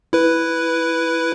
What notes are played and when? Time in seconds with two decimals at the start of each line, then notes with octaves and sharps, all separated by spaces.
0.13 E4 B4